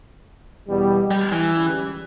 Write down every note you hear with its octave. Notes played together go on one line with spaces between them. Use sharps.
E2 B2 G3
G3
E3
C#2 C#3 G3